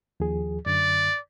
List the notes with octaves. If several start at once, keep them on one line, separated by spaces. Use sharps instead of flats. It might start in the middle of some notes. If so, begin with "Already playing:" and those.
D#2 F3 G#4
F#2 D3 D5